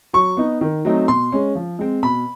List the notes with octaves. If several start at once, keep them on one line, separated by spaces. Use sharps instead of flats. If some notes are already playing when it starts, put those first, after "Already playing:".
F#3 C#6
B3 D#4
D#3
F#3 A3 C4 D#4
B2 C6
G#3 C#4
F3
G#3 C4
B2 B5